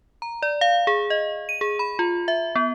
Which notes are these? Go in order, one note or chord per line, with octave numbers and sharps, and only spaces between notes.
A#5
D5
F5
G#4
D#5
D#7
G#4
B5
F4
E5
B3